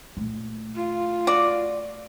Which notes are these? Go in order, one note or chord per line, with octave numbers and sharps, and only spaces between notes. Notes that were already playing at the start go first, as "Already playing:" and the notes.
A#2 A3
F4
F#4 D5